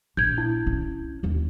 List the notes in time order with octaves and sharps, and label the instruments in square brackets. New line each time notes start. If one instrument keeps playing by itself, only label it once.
[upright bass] A#1 [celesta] G6 G#6
[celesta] E4
[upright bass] C#4
D#2 D#3